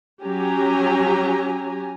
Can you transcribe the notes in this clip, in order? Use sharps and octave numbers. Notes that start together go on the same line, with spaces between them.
F#3 C#4 G4 G#5 A#5